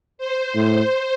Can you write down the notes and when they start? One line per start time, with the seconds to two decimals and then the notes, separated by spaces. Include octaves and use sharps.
0.18 C5
0.55 A2